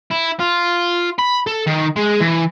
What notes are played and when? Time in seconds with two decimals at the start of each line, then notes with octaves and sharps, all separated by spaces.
0.11 E4
0.40 F4
1.19 B5
1.47 A4
1.67 D#3
1.96 G#3
2.21 E3